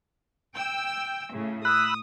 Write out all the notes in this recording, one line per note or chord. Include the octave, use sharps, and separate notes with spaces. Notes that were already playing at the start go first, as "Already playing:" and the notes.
G5 E6
A2 C#3
B5 D#6 E6 F#6